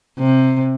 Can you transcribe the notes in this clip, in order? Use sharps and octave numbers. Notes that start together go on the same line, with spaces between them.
C3